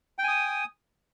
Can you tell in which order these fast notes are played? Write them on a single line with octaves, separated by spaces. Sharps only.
G5 G#5 D#6